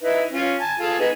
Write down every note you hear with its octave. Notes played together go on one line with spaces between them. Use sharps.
D#4 E4 B4
C#4 F4
G#5 A5
F4 G#4 A4
B3 D#4 G#4